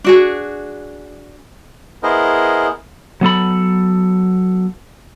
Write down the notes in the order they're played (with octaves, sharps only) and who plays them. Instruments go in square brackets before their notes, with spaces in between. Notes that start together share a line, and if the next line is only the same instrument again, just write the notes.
[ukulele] D4 F#4 G#4
[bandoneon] B3 E4 G#4 A#4 C5 D#5
[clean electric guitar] F#3 B3 A4 B5